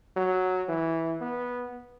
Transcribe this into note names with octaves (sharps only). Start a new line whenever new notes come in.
F#3
E3
B3